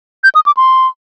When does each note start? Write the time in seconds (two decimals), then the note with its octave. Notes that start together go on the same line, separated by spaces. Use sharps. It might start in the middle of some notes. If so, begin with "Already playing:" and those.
0.24 G6
0.35 D#6
0.46 D6
0.57 C6